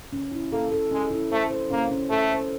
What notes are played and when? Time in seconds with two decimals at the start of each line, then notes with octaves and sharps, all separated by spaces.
0.12 C#4
0.32 E4
0.52 A#3 A4
0.72 A4
0.91 G#3 C#4
1.11 E4
1.31 A3 C5
1.50 C5
1.70 A#3 C#4
1.91 C#4
2.10 A3 A4
2.31 C5